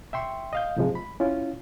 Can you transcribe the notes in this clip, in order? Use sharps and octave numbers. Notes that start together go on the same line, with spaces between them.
E5 G5 C6 C#6
D#5 F5 G6
F2 G#2 C3 F3 G#3
B5
C#4 E4 F4